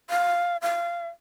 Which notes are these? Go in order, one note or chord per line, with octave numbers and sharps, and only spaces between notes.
F5
F5